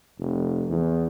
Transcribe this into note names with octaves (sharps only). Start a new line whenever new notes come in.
F1
E2